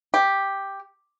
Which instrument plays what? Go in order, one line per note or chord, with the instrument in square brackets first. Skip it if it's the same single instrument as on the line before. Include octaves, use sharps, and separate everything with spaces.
[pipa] G4